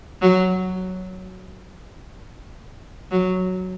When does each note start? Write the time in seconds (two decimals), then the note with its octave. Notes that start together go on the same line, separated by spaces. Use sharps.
0.22 F#3
3.11 F#3